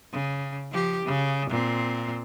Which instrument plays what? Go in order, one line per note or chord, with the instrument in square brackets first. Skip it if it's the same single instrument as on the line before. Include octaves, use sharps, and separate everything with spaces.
[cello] C#3
F3 G4
C#3
A#2 C4